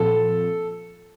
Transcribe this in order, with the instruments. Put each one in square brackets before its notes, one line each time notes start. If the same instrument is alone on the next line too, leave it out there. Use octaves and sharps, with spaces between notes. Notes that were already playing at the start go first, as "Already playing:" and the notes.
Already playing: [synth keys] A#2 F3 C4 F4 [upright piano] A4